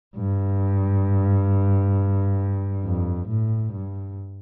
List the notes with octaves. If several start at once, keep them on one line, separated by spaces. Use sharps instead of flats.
G2
F2
A2
G2